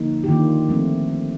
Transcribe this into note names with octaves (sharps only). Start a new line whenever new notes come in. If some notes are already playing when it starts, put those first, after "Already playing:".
Already playing: D3 F3 A#3 D#4
G4
D#3 A#3 D4 F4
F3 A3 C4